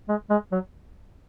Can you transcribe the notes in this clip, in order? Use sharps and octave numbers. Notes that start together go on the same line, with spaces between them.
G#3
G#3
F#3